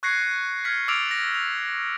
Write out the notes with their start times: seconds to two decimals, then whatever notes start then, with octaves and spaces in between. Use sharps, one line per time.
0.03 C#6 F#6 G#6 A#6 C7 C#7
0.64 F6 G#6 B6 C#7
0.88 D6 E6 F6 A6 D7 F7
1.11 A#6
1.35 F7